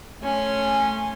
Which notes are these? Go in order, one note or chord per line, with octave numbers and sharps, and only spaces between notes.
A3 C#4 G#5 C6